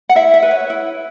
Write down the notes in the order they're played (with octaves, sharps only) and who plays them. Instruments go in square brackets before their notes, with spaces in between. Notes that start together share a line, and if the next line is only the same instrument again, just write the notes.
[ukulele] F#5
E4 E5
E5
B4
C#5
E4